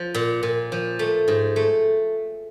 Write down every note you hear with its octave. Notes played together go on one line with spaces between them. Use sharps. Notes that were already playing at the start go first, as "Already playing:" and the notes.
Already playing: F3
A#2
A#2
F3
A3
G#2
A3